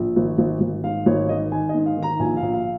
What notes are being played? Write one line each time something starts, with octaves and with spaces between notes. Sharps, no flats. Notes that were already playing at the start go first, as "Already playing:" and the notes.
Already playing: A#1
G#1
G#1
G#1
G#2 F5
G#1 C#5
D#3 D#5
D#3 G#5
D#5
G#2
F5
D#3
A#5
A#1 G#5
F5
A#1
F5